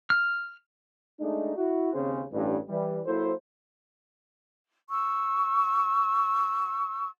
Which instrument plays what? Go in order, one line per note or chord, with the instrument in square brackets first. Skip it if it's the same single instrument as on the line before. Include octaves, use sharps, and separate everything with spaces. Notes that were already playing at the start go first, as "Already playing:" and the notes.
[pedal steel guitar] F6
[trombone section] G#3 A3 D4 D#4
E4 F#4
D#2 C#3 C4 C#4 G#4 C5
A1 G2
E3 G3
F#3 A#3 E4 A4 C5
[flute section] C#6 E6